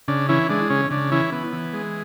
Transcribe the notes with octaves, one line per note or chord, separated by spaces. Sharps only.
C#3 D4
E3 C#4 E4
G#3 D4
C#3 C#4
C#3 D4
E3 C#4 E4
B3
E3
G#3